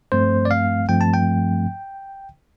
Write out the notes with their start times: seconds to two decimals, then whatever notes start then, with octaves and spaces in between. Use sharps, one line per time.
0.12 G2 F3 A3 C4 C5
0.45 D5
0.51 F5
0.89 G2 F3 A3 C4 G5
1.01 A5
1.14 G5